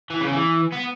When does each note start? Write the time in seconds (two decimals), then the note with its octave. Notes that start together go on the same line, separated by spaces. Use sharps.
0.10 E3
0.21 C#3
0.32 E3
0.72 B3